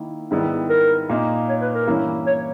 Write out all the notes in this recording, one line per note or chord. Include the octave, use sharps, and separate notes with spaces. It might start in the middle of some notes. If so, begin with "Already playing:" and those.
Already playing: D#3 A#3 E4
G#2 D#3 G3 B3 E4
A#4
A#2 A#3 D#4
C#5
B4
A#4
G2 E3 A#3 C#4 E4
C#5